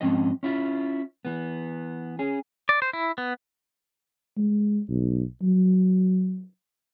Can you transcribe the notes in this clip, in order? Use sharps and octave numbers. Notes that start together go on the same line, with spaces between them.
G#2 F3 C4 C#4 D#5
C#4 E4 F4
E3 B3
C#4 G#4
D5
C5
E4
B3
G#3
B1
F#3